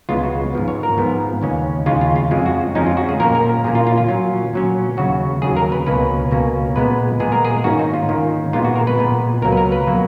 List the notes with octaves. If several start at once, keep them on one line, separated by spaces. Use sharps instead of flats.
C#2 C#3 G#3 B3 F4
F#4
G#2 F3 B3
C#5
A#4
G#2 F3 B3
D#2 C#3 G#3 C#4
D#2 C#3 G#3 C#4 F4
F4
F4
F2 F3 G#3 C#4 F4
F#4
F2 F3 G#3 C#4 D#4
F4
F#4
G#4
A#2 F3 A#3 C#4 A#4
A#4
A#4
A#2 F3 A#3 C#4 G#4
F4
F4
F4
A#2 F#3 C#4
A#2 F#3 C#4
D#2 C#3 F#3 F#4
D#2 C#3 F#3 G#4
A#4
B4
C#2 B2 A#3 C#4 B4
C#2 B2 A#3 C#4
A#2 G#3 B3 B4
A#2 G#3 B3 G#4
A#4
G#4
G#2 D#3 A#3 C#4 F#4
D#4
F4
G#2 D#3 A#3 C#4
A#2 G#3 B3 F4
F#4
A#4
B4
A#2 G#3 B3
C#2 B2 F#3 A#3 A#4
B4
A#4
B4
B2 F#3 A#3